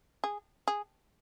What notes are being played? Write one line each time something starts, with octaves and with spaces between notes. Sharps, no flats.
G#4
G#4